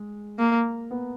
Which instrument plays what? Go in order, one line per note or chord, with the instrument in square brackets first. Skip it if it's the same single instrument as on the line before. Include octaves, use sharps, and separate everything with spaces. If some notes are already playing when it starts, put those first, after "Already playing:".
Already playing: [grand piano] G#3
[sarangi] A#3
[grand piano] B3